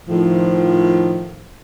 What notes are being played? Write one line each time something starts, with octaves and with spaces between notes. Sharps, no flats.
A2 D#3 F3